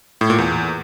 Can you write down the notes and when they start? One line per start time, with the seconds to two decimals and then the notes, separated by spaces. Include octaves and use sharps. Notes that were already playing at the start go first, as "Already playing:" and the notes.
0.21 A2
0.30 A#2
0.38 E2